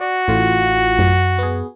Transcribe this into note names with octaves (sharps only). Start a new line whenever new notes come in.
F#4 D5
A1 A2 F4
F#2
B3 G#4